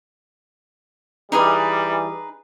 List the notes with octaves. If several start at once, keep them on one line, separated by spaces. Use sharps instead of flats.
E3 G3 D#4 G#4 B4